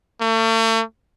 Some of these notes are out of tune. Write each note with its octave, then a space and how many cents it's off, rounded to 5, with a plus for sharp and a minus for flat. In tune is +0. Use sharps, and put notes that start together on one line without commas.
A3 +40